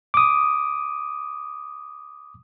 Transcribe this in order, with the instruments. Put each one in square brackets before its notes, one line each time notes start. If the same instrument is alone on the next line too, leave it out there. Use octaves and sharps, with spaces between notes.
[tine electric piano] D6 D#6